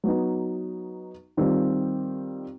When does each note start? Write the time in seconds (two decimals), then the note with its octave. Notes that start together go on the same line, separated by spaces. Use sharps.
0.04 F#3 B3 D#4
1.37 D#3 G3 C4 F4